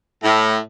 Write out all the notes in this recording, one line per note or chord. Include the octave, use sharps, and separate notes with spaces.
A2